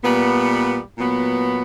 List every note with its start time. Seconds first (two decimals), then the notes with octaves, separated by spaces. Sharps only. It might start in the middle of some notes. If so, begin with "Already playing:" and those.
0.04 A#2 G3 B3
0.97 A#2 F#3 B3